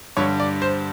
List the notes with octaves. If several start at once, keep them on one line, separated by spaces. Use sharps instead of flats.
G2 D3 G3 C#5
D5
C5